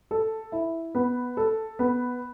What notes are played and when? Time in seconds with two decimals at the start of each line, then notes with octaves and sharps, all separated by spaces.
0.11 A4
0.52 E4
0.95 B3
1.37 A4
1.79 B3